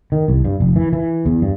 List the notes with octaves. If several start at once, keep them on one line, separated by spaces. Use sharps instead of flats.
D#3
C2
G2
F1
E3
E3
E2
G2